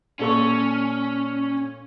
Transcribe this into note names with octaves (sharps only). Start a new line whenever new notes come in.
A#2 C#4 A4 C#6